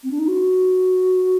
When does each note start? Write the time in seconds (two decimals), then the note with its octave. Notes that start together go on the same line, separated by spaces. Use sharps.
0.04 C4
0.11 D4
0.19 D#4
0.28 F#4